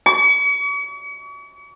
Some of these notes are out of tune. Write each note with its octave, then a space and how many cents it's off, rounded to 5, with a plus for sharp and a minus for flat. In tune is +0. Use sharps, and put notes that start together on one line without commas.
C#6 +40